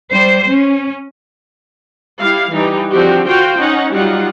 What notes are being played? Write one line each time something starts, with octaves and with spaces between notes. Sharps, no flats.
G3 C5
C#4
G3 E4 F5
E3 G3 D#4 G4
D3 F3 C4 D4 F#4 G4
F4 F#4 C5 F5 G5
C#4 D#4 F#5
F#3 G3 D#4 F4 F#5